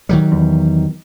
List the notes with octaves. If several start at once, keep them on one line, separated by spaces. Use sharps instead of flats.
D#3 F#3 G3
E2